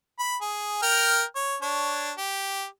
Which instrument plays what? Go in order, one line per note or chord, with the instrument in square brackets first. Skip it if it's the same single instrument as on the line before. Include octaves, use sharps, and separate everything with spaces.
[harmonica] B5
G#4
A#4 G5 F6
C#5
D4 C#5
G4